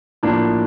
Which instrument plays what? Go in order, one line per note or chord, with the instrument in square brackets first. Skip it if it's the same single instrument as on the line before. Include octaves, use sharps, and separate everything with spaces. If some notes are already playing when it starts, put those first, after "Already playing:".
[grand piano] A2 F3 A#3 D4